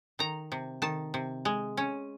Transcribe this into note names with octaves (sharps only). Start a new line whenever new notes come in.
D#3 A#5
C3
D#3 A5
C3
G#3
C#4